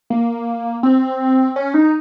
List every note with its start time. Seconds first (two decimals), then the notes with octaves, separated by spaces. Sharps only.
0.10 A#3
0.83 C4
1.56 C#4
1.74 D#4